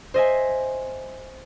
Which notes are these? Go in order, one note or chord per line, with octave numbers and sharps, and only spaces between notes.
C5 D#5 E5 G#5